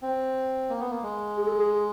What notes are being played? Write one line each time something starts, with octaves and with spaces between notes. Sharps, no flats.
C4
A#3
B3
A#3
G#3
G#4
A4
G#4